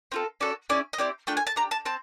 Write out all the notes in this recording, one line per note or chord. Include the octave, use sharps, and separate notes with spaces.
C4 F4 A4
C#4 F#4 A4 D5
C#4 E4 G#4 D5
D#5
C4 E4 G4 D5
A3 D4 F4 G5
G#5
A5
D4 G4 A#5
A5
C4 A5